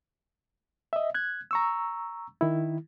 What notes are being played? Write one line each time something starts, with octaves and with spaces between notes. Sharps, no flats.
D#5 E5
F#6 G#6
A#5 C#6 E6
D#3 E4